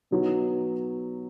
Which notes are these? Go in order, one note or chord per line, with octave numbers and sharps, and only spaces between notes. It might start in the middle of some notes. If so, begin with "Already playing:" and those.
B2 F#3 B3 D#4